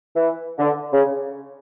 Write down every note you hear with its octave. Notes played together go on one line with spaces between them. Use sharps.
E3
D3
C#3